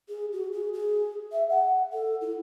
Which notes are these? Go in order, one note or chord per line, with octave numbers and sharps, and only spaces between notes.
G#4
F#4
G#4
G#4
E5
F#5
A4
E4